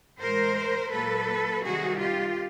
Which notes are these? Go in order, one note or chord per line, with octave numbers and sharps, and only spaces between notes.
A2 E3 G#3 A#4 C5
A#2 F#3 A#3 A4 B4
C3 D#3 G3 C4 D#4 F#4 G#4
F4 G4